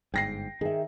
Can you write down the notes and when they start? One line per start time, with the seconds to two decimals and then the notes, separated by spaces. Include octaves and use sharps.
0.14 G1 G#2 G5 A#6 C7
0.61 D#3 G#4 E5